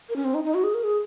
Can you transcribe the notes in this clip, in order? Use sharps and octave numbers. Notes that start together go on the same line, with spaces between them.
A#4
C#4
C4
D#4
D#4
F#4
G#4
A#4
G#4